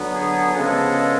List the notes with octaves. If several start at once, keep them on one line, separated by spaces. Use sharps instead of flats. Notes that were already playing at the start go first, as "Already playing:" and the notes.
Already playing: D3 F#3 B3
G#4
C#3 F3 G#3 B3 A4